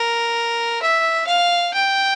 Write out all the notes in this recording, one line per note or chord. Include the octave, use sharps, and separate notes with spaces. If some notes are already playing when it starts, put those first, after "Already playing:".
Already playing: A#4
E5
F5
G5